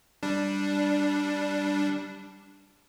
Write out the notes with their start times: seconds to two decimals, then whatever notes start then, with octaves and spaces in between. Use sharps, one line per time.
0.23 G3 D4